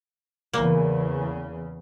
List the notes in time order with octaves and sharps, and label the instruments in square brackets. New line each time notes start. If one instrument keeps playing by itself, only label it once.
[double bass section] E2 C#3 [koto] A#3